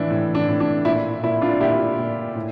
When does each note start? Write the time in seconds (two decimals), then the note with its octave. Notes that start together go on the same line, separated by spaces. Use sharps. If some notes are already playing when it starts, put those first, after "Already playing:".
Already playing: A2 E3 D4 E4
0.10 A2
0.35 D4
0.48 A2
0.60 D4
0.85 A#2 E4
1.23 A#2 E4
1.41 D4 F4
1.61 A#2 E4 G4
1.99 A#2
2.36 A2